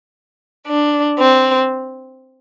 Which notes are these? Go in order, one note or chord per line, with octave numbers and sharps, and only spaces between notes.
D4
C4